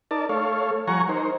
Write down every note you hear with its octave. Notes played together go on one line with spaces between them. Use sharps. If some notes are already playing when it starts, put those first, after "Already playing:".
D#4 A#4 D5 A5
A3 A4 C#5 F5
F3 G3 F#5 G#5 A#5 C#6
D#4 A#4 C5